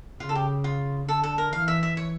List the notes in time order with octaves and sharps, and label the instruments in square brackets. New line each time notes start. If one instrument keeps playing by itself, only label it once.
[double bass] C#3 [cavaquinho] F4
[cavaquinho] A4
G4
F4
[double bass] D3 [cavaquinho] A4
[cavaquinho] A4
A#4
[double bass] E3 [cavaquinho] F5
[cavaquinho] E5
E5
C#5